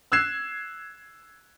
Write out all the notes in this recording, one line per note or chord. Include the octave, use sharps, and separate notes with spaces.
E6 F#6 G#6 C7 E7